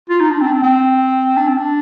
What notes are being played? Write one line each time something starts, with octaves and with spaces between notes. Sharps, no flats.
F4
D#4
D4
C4
D4
C4
C4
D4
C4
D4